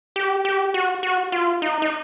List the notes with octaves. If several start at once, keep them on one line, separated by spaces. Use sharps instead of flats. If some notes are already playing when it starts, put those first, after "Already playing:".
G4
G4
F#4
F#4
F4
D#4
D#4